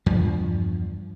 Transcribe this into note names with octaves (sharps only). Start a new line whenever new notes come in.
E2 G2 F3